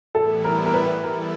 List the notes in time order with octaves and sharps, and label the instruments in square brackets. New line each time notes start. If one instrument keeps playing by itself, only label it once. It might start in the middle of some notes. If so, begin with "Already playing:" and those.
[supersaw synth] A2 E3 G3 B3 E4 [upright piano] A4
[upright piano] A#4
A#4
B4
[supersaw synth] E3 G3 B3 E4 A4 [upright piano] A#4